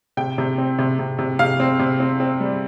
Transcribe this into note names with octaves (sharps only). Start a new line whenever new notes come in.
C3 G5
C3
C4
C3
C3
C3
C3 F5
C4
C3
C4
C4
G3